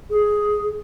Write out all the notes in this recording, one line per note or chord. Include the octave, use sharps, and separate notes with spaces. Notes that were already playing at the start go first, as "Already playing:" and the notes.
G#4